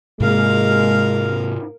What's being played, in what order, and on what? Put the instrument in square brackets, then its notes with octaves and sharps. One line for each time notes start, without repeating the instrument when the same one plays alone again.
[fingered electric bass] G#2 C3 A#3 [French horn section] G#3 [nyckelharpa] A#4 F5